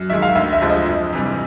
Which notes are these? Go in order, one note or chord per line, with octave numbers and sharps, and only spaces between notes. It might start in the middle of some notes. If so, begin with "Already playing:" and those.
Already playing: F#2
D#3 G#3 E5
F5
D2 E5
E5
D3 F3 G#3
D#5
F2
C3 E3 G3